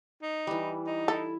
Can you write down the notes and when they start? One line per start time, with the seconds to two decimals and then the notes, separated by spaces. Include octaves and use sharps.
0.22 D#4
0.47 E3 G3
0.86 D#4
1.08 E4 A4